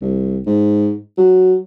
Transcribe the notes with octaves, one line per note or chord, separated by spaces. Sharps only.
C2
G#2
F#3